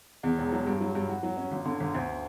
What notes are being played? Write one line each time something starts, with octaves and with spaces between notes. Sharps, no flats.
E2
E1
F#3
G2
F#3
G2
F#4
F#3
C#4
G1
D3
G1
D2